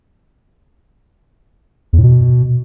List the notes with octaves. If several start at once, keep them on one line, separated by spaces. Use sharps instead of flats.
E2
A2
B2